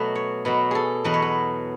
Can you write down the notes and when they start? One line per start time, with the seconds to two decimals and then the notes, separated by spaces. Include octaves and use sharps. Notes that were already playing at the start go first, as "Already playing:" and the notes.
Already playing: B2 F#3 A3 B4
0.15 C#5
0.45 B2 F#3 B4
0.71 G#4 A4
1.04 E2 B2 F#3 B4
1.14 C#5
1.22 B4